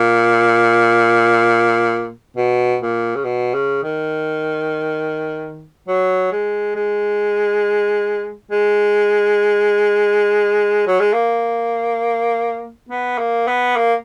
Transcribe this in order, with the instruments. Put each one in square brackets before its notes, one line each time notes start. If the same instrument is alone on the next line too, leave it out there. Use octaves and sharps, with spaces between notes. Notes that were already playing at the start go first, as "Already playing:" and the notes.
Already playing: [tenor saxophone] A#2
B2
A#2
C#3
B2
C#3
D#3
F#3
G#3
G#3
G#3
F#3
G#3
A#3
B3
A#3
B3
A#3